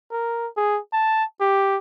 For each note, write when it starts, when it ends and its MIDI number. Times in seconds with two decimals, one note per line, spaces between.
0.12 0.47 70
0.57 0.79 68
0.93 1.24 81
1.41 1.78 67